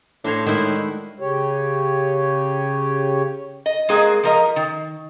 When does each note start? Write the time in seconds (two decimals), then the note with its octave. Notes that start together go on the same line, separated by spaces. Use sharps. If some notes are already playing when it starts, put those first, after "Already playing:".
0.24 A2 D4 C5 C#5 A#6
0.46 D#3 G#3 E4 F#4 C5
1.20 C#3 G4 C#5
3.66 D#5
3.89 G#3 A#3 C4 G#4
4.24 F3 A#4 D#5
4.56 D#3